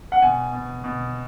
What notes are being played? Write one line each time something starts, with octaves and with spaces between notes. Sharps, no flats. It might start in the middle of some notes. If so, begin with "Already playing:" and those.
F#5
B2 G#5
B2
B2